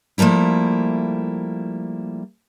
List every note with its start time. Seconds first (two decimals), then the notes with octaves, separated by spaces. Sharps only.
0.18 F3 G3 A3 A#3 E4